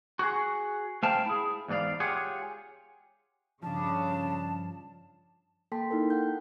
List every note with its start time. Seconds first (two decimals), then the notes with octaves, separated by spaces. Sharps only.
0.19 F#4 G#4
1.03 A3 C5 F5 G5 A5
1.26 E4 G#4
1.68 E2 G#2 B3 D5 F5
2.00 F4 G4 G#4 C#5 F#5
3.63 G2 C#3 F3 D4 A5
5.72 A#3 A4 G5 A5 C6 B6
5.90 A#3 D#4 E4 A4 A#4
6.10 F#5 G5 G6